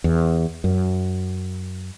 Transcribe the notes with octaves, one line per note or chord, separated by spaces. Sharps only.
E2
F#2